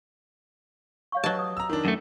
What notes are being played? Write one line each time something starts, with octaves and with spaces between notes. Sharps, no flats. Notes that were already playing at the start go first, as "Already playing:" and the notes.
C#5 F5 C#6
F#3 G4 B4 D#5 A5
B4 D#6
A#5 E6
D#3 D4
F#2 A3